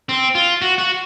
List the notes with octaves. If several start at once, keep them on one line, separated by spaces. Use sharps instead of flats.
C4
F4
F#4
F#4